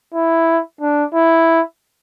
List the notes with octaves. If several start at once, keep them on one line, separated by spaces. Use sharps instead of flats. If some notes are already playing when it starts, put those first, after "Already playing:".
E4
D4
E4